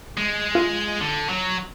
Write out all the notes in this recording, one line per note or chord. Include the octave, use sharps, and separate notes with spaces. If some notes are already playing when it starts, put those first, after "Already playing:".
G#3
F4
D3
F#3